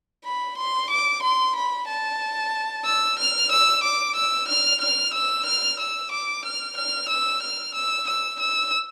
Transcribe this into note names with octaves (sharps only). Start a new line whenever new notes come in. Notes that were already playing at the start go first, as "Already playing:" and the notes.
B5
C6
D6
C6
B5
A5
E6
F6
E6
D6
E6
F6
F6
E6
F6
E6
D6
F6
F6
E6
F6
E6
E6
E6